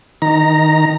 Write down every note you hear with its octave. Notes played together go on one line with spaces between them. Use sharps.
D#3 A#5